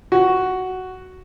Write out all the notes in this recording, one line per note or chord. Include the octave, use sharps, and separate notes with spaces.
F#4